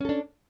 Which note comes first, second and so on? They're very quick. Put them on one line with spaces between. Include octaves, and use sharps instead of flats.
C#4 A4 D4